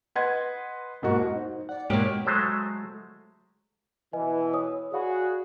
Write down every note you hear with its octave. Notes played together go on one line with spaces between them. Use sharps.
B4 D#5 F#5 C6 G#6
E1 G#2 A#3 F#4
D#4 C5
D5 F#5
G#2 B2 G#3 A#3 G4 C#5
F#3 G#3 A3 C5
B2 E3 B4 D#5 G#5
C#5 D#6
F#4 G#4 D5 F5 B5